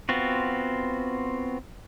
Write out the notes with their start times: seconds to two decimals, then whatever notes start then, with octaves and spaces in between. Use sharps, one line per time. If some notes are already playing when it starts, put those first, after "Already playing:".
0.09 B3 C4 F4 F#4